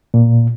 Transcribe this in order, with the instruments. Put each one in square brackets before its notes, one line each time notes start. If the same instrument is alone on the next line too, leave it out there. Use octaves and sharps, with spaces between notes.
[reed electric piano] A#2